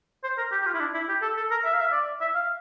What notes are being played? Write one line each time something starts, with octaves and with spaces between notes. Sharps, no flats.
C5
A#4
G4
G4
F4
E4
D4
E4
G4
A4
A4
A#4
E5
F5
E5
D5
E5
F5